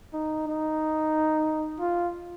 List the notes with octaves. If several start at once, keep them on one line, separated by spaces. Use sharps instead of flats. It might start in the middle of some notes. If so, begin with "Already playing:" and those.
D#4
D#4
F4